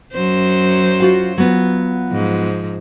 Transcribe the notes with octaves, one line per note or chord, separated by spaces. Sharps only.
F#2 F#3 C5
F4 F#4 F5
F#3 B3 F4
G#2 F3